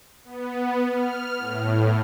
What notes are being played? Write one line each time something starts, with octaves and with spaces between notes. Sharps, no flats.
B3
F6
A2